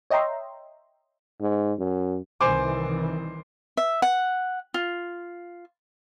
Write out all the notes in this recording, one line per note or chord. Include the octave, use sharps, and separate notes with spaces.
C#5 D#5 E5 G5 A#5 C6
G#2
F#2
C2 D#3 E3 C5 G#5 D6
E5
F#5
F4